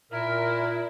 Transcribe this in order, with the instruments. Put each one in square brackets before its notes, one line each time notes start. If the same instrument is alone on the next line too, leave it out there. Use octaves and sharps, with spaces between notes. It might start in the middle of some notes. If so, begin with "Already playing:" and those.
[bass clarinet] A#2 [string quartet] E4 [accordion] A#4